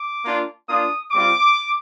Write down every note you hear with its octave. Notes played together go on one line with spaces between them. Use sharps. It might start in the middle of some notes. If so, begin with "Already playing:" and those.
Already playing: D6
A#3 D4 F4
A#3 D4 F4 D#6
G3 C4 F4 D6